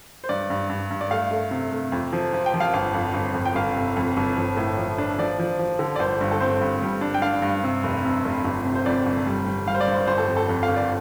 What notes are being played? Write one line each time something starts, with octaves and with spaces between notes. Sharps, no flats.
C5
G2 D5
G2
G2
G2
D5
A3 F5
A3
C3
A3
F2
F3
F3
G5
F3
F5
G1 F5
F2
G1
F2
G5
G1 F5
C3
F2
G1
F3
A2
F3
D4
F3 D5
F3
F3
D3
D5
G1 C5
G2
A4
C4 C5
G2
G3
D4
G5
D4 F5
G2
C3
F1
C3
F1
G1
C3
C5
F2 D5
G1
G3
G3
G3 F5
C5
D5
G2
C5
G1 C5
A4
F2
A4
F2
F5
G1
D5